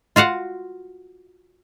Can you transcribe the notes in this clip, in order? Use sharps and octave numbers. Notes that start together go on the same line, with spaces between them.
F4 F#4 F5 F#5